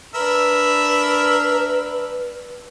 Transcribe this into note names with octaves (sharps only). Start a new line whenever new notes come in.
D4 A#4 B4 E5 B5